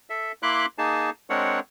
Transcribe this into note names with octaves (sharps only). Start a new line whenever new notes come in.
A4 E5
A#3 E4 B5 C6 D6 F#6
A#3 D#4 G#4 A5
G#3 C4 D4 A#4 C#5 F#5